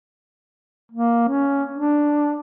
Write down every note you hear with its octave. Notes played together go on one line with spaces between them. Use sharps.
A#3
C#4
D4